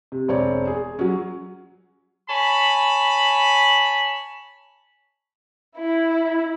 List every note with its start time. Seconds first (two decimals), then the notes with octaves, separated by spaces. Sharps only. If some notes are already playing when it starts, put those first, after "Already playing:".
0.12 C3
0.28 E1 C4 C#5 D5
0.67 G#4
0.99 F#3 C#4
2.29 C#5 G#5 A5 B5
5.78 E4